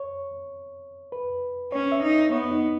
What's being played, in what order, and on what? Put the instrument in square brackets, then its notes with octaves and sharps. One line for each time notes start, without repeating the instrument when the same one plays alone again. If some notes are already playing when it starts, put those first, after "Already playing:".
Already playing: [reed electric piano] C#5
B4
[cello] C#4 [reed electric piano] C#5
[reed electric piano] E5
[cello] D#4
[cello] B3 [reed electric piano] C#5
[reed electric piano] D#4